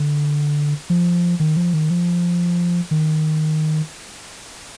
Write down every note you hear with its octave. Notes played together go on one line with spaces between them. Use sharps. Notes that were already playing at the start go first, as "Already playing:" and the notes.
Already playing: D3
F3
D#3
F3
D#3
F3
D#3